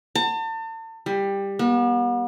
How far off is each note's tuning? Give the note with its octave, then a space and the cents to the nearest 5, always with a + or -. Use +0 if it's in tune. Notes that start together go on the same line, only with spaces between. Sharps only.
A5 +40
G3 +15
B3 -40